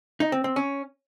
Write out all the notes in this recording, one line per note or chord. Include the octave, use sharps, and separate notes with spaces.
D#4
C4
C4
C#4